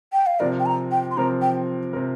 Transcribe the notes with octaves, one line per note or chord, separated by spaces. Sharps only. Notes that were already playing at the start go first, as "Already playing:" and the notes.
G5
F5
C3 F3 C4 A#4 D5
G5
A#5
G5
C6
C3 F3 C4 A#4 A#5
G5
C3 F3 C4 A#4